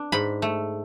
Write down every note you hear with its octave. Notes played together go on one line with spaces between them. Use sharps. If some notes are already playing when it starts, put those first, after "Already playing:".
Already playing: D4
G#2 B5
A3